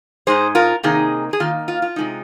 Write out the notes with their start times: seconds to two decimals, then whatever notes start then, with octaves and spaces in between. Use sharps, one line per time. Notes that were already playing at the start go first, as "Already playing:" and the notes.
0.27 G#2 G#3 D#4 G#4 C5
0.55 F4 A#4
0.83 C3 D#3 A#3 D#4 G#4
1.33 G#4
1.40 D#3 A#3 D#4 F4
1.68 F4
1.82 F4
1.96 C3 G#3 D#4